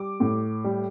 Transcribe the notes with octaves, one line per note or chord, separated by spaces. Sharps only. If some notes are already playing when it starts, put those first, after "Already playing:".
Already playing: G3 D6
A2
G3